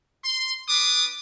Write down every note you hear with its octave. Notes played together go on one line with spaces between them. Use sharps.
C6
D4 B4 D6 D#6